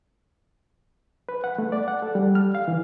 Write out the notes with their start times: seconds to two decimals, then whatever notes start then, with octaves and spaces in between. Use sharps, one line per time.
1.29 B4
1.44 F#5
1.58 A3
1.72 D5
1.88 F#5
2.02 A4
2.15 G3
2.35 F6
2.55 F5
2.68 E3